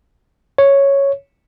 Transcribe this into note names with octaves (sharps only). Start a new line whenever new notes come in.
C#5